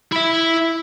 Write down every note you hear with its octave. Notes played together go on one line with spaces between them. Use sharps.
E4 E5